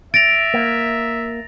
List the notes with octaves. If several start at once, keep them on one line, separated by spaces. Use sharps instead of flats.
E5 A6 A#6 D7 F7
A#3